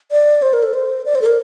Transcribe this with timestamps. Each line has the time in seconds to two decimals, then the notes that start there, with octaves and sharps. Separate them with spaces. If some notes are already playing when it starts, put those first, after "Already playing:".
0.11 D5
0.42 C5
0.53 A#4
0.63 A4
0.74 C5
1.06 D5
1.15 C5
1.22 A4
1.26 A#4